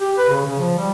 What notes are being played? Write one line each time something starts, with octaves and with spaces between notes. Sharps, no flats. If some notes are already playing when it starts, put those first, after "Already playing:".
G4
B4
C#3
C#3
F3
G3